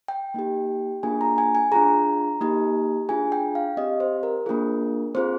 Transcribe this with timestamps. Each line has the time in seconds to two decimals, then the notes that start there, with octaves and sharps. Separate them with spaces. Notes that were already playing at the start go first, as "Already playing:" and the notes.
0.08 G5
0.34 A#3 D#4 G4
1.03 A#3 D4 F4 G#4 G#5
1.21 A#5
1.38 G#5
1.55 G#5
1.72 D4 F4 G#4 A#5
2.41 A#3 D#4 G4
3.09 D4 F4 G#4 G#5
3.32 G5
3.55 F5
3.77 C4 G4 D#5
4.00 C5
4.23 A#4
4.46 A#3 D4 F4 G#4
5.15 C4 F4 G#4 C5